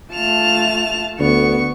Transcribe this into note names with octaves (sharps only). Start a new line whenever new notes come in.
A3 F4 A5 F7
D2 B3 C#6